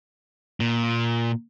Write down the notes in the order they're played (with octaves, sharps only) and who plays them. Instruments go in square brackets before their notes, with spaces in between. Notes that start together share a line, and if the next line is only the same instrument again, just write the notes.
[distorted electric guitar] A#2